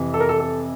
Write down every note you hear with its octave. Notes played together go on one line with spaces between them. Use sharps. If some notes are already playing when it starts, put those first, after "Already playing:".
Already playing: F2 C3 E3
A4
A#4
A4
A4